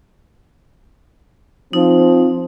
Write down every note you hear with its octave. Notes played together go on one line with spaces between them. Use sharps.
F3 C4 D#4